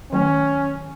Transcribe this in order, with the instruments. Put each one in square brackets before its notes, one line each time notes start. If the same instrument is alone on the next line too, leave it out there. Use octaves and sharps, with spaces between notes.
[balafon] D#3 F#3 A3 [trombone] C#4